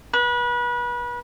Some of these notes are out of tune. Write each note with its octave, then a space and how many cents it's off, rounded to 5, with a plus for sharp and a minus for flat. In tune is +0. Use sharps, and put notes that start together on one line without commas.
B4 -30